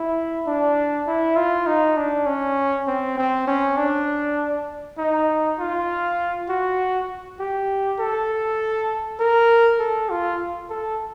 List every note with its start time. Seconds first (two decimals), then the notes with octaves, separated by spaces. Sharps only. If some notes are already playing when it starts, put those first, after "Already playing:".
Already playing: E4
0.47 D4
1.07 E4
1.36 F4
1.66 D#4
1.97 D4
2.26 C#4
2.87 C4
3.17 C4
3.47 C#4
3.77 D4
4.98 D#4
5.59 F4
6.49 F#4
7.39 G4
7.99 A4
9.19 A#4
9.79 A4
10.10 F4
10.70 A4